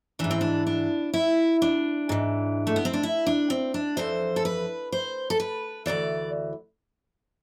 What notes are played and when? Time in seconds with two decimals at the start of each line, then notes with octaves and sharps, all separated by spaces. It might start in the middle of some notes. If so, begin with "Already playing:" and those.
0.19 G#2 E3 D4
0.31 C4
0.41 D4
0.67 D4
1.14 E4
1.62 D4
2.09 G#2 E3
2.67 A3
2.76 B3
2.85 C4
2.93 D4
3.03 E4
3.26 D4
3.50 C4
3.74 D4
3.97 F2 E3 C5
4.36 A4
4.45 B4
4.92 C5
5.30 A4
5.40 B4
5.86 D2 C3 E3 D5